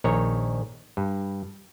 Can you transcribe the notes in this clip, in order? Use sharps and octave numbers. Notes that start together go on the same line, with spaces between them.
A#1 D#3 C#5 A#5
G2